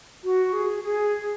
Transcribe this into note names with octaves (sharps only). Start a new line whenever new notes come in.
F#4
G#4
G#4